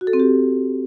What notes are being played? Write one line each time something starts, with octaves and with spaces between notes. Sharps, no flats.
F#4
A4
C4
G4